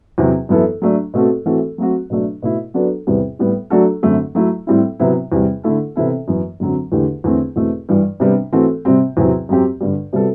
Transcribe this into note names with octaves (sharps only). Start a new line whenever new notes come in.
E2 C3 F#3
F#2 E3 B3 E4 A4
F#3 A3 D4
B2 A3 C4 F#4 A4
E3 A3 C4 F#4 A4
F#3 A3 C4 F#4
B2 F#3 A3 D4
B2 A3 E4
F#3 B3 D4 F#4 A4
E2 C3 G3 B3
A2 G3 B3
F#3 A3 D4 F#4 A4
F#2 D3 A3 C4
F#3 A3 E4
A2 G3 C4 E4
C3 F#3 B3 E4
E2 C3 G3
D3 A3 E4 A4
C3 E3 B3 E4 A4
F#2 E3 B3
F#2 D3 F#3 C4
E2 D3 A3 E4 G4
E2 D3 A3 C4
E2 B2 A3 C4
G2 E3 G3
C3 G3 B3 D4
E3 A3 C4 F#4 A4
C3 G3 C4
E2 C3 F#3 C4
F#2 F#3 C4 G4
G2 D3 G3
C3 G3 B3 F#4 A4